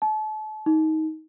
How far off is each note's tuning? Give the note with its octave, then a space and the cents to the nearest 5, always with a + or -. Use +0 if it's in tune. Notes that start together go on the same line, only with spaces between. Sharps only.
A5 -35
D#4 +20